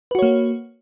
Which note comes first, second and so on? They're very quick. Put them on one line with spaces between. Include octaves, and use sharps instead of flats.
B4 F#4 C#5 A#3